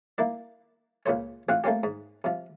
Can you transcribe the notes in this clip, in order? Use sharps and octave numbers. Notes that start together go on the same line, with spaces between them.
A#3 E4 D5
C#2 A#2 C#3 C5 C#5
A1 C4 F4 F#5
A3 A#3 C4 C#4 G4
G#2
C3 F3